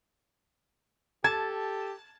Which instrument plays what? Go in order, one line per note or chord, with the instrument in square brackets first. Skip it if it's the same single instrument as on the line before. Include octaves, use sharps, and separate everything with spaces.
[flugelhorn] G4 [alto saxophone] A4 [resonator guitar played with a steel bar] A5 [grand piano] G#6